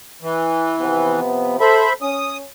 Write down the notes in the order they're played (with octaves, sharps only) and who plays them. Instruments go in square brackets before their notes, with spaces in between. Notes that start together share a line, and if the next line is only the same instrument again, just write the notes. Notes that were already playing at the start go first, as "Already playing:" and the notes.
[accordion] E3
[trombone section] C3 F3 B3
[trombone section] A4 [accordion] C5 E5 B5
[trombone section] C#4 [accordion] D#6